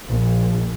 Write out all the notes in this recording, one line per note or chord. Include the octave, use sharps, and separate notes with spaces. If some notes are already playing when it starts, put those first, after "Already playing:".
A#1